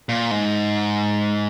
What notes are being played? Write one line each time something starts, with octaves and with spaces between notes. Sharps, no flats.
A#2
G#2